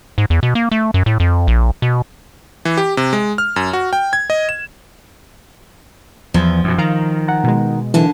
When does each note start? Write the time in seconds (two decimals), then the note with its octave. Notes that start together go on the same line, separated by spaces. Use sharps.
0.18 G#2
0.30 E2
0.43 B2
0.55 A#3
0.71 A3
0.94 F#2
1.06 A2
1.20 F2
1.48 A#1
1.82 B2
2.65 E3
2.77 G4
2.97 C3
3.13 G#3
3.38 F6
3.56 F#2
3.73 F#4
3.93 G5
4.13 G#6
4.30 D#5
4.49 E7
6.34 E2 F3
6.64 F#2 B2
6.78 D#3 F5 A#5
7.28 F#5 A#5
7.44 B2 G#3
7.94 D#2 D3 E3 A5